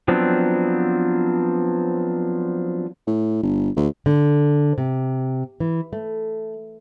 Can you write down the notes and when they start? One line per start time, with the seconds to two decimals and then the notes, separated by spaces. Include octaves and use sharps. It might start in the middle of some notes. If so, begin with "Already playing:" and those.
0.08 F3 F#3 B3 C4 D4
3.07 A2
3.43 G1
3.76 D2
4.06 D3
4.78 C3
5.60 E3
5.93 A3